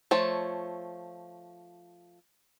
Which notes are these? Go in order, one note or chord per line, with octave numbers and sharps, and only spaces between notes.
F3 A3 C#5